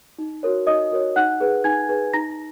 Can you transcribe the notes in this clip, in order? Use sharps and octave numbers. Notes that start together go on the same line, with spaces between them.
D#4
F#4 A#4 C#5
D#4 D#5 D#6
F#4 A#4 C#5
D#4 F#5 F#6
G#4 B4
D#4 G#5 G#6
G#4 B4
D#4 A#5 A#6